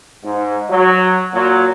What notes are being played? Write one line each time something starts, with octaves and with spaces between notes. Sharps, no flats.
G#2
F#3
A#2 F#3